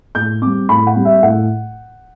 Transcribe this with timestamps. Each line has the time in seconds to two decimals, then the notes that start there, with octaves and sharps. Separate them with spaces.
0.15 A2 G6
0.42 G3 C4 D6
0.69 A2 B5
0.87 F#5
0.96 G3 C4
1.05 E5
1.23 A2 F#5